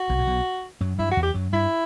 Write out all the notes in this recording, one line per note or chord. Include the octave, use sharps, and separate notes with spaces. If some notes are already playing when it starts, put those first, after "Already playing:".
Already playing: F#4
B1 B2
A2
B1 B2
F#2 F#3
G2 G3 E4
F#3 F#4
E2 E3
G4
F#2 F#3
G2 G3 E4